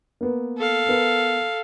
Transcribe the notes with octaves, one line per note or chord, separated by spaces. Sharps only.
A#3 B3
A4 F5
B3 A#4